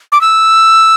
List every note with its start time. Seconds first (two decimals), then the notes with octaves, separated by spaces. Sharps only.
0.12 D6
0.21 E6